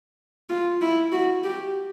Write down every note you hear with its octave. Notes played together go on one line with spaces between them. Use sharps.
F4
E4
F#4
G4